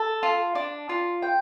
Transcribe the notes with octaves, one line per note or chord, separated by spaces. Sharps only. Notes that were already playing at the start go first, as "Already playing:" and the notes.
Already playing: A4 A5
F4
D4
F4
G5